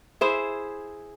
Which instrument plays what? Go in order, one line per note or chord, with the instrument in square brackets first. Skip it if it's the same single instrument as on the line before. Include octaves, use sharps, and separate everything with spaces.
[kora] E4 G#4 C5 E5